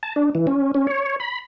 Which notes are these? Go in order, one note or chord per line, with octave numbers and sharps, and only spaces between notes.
A5
D4
E3
C#4
C#4
C#5
B5